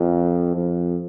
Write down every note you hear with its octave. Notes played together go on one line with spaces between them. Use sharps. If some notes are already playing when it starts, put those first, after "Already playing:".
Already playing: F2
F2